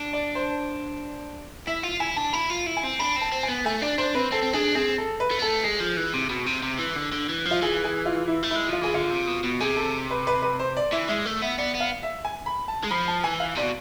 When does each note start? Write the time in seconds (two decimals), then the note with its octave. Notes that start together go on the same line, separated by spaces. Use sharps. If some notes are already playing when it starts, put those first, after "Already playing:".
Already playing: D4
0.13 D5
0.35 C5
1.67 E4 E5
1.83 F4
2.00 E4 G#5
2.16 D4 A5
2.33 E4 B5
2.50 F4
2.66 E4
2.77 G#5
2.83 C4
2.99 D4 B5
3.16 C4
3.21 A5
3.32 C4
3.43 G#5
3.49 B3
3.65 A3 G#5
3.82 D4 D5
3.98 D4 C5
4.15 C4 B4
4.31 C4 A4
4.42 C4
4.53 D4 G#4
4.75 C4 G#4
4.98 A4
5.20 B4
5.31 A3
5.39 B3
5.42 A3 A4
5.63 G#3 G#4
5.80 F3
5.97 E3
6.14 C3
6.30 B2
6.46 C3
6.63 C3
6.79 E3
6.96 D3
7.13 D3
7.29 E3
7.45 F3
7.51 F4
7.62 E3 G#4
7.84 G#4
8.05 F4
8.28 E4
8.43 A3
8.51 G#3 E4
8.68 F3 F4
8.82 E3 G#4
8.94 D3 F4
9.11 C3
9.27 B2
9.44 B2
9.60 C3 G#4
9.76 A4
10.10 B4
10.27 B4
10.42 B4
10.59 C5
10.77 D5
10.92 E3 E5
11.08 G#3 E5
11.26 A3
11.42 B3 E5
11.58 B3 D5
11.75 B3
11.81 F5
12.03 E5
12.25 G#5
12.46 B5
12.68 A5
12.84 G#3
12.91 F3 B5
13.08 A5
13.24 E3 G#5
13.40 F5
13.57 C3 D5
13.63 B2